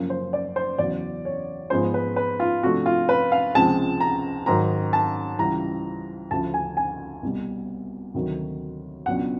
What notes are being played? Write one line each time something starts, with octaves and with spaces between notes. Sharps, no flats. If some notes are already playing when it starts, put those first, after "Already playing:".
Already playing: F#2 C#3 F3 A#3
C5
D5
C5
E2 C#3 F#3 D5
C#5
G#2 F3 G#3 B3 C5
B4
B4
F4
C3 F3 A3 D4 F#4
F4
B4
F5
C#2 C3 F3 G#3 C4 A5
A#5
G#2 D#3 F#3 A#5
A5
C#2 C#3 E3 G3 A#5
D2 C#3 F3 A5
G#5
G#5
C2 B2 G3
D2 C3 D#3 F#3
C#2 B2 F#3 B3 D4 F#5